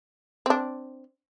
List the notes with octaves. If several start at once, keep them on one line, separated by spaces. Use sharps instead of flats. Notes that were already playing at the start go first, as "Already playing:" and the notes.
C4 D4